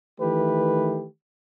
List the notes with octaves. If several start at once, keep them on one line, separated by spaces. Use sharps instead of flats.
D#3 E3 A3 G4 B4